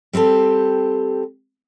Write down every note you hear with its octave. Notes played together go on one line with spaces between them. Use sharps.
G3 C4 G4 A4 C5